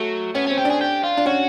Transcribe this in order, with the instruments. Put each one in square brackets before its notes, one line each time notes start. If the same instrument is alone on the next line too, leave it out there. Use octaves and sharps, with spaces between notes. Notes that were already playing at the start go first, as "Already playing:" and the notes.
Already playing: [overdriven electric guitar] F#3 [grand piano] A3
[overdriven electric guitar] B3 [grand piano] C#4
[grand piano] C4 [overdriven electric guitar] C#4
[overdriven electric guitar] G4
[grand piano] D4 [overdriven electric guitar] G#4
[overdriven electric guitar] G4
F4
[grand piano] D4
[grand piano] C#4 [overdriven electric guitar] F#4